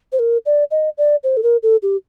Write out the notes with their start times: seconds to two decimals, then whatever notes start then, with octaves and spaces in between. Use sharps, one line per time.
0.12 C5
0.19 A#4
0.46 D5
0.71 D#5
0.98 D5
1.24 C5
1.37 A4
1.43 A#4
1.63 A4
1.83 G4